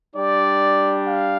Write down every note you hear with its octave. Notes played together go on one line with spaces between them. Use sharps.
G3 D4 G4 D5
F5